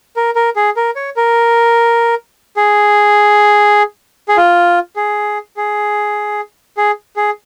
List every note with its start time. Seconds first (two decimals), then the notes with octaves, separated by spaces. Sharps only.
0.16 A#4
0.36 A#4
0.56 G#4
0.77 A#4
0.96 C#5
1.17 A#4
2.57 G#4
4.28 G#4
4.37 F4
4.96 G#4
5.57 G#4
6.77 G#4
7.16 G#4